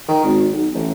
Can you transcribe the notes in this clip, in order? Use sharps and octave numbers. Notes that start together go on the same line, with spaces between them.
D#3
G#1
B1
A1